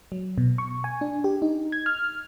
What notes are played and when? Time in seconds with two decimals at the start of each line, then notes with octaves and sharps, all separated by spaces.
0.12 F#3
0.38 B2
0.58 C#6
0.84 G#5
1.01 D4
1.24 G4
1.42 D#4
1.72 G#6
1.86 F6